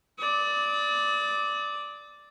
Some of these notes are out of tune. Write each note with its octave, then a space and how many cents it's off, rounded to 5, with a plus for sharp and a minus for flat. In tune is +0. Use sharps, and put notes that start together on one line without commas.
D5 +0 D#6 +45